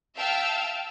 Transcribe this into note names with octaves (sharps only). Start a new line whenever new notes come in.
E5 F5 G5 A5 E6 F6